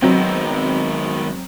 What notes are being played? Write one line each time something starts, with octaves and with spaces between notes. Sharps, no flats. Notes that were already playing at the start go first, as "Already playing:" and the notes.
D#3 F#3 G#3 B3 C4